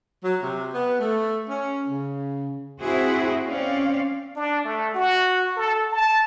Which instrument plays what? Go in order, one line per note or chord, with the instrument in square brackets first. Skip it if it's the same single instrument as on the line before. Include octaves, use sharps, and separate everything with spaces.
[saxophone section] F#3
C3
B3
A3
C#4
C#3
[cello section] C4 E4 F#4 G#4 C5
C4 C#4 D5 F5
[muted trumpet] D4
A3
F#4
A4
A5